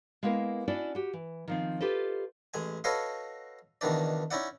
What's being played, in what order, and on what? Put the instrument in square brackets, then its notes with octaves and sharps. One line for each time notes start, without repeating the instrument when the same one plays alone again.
[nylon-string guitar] G#3 A#3 B3 E4 A#4
C#4 D4 E4 F#4 D5 D#5
F#4 G4
E3
D#3 F3 C4
F4 G4 A4 B4 C5 D#5
[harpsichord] A1 G#3 G#5
F#4 A4 B4 C#5 D#5 F5
C#2 B2 D#3 E3 D4 D5
C#4 D#4 E4 D5 F#5